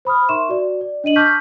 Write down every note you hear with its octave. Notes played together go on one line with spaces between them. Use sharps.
C5 B5 D#6 F6
D#4 A#4 E5 C6 C#6 E7
F#4 D5
D5
D4 D#5 D#7 F#7
A5 C#6 D6 F6 G6 B6